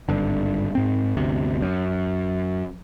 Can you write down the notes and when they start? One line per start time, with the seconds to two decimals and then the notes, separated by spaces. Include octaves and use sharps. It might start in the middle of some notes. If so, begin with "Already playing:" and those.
0.09 G#1 G2 D3
0.75 G#2 C4
1.17 G1 D2 C3
1.62 F#2